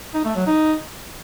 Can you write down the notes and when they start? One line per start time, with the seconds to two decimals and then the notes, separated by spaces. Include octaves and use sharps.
0.14 D#4
0.25 A3
0.36 F#3
0.47 D#4